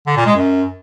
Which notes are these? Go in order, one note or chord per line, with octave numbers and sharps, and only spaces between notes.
D3
A#2
G#3
F#2